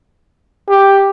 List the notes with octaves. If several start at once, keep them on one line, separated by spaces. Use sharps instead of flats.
G4